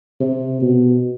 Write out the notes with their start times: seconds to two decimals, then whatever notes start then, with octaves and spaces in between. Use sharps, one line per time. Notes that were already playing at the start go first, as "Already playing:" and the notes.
0.20 C3
0.61 B2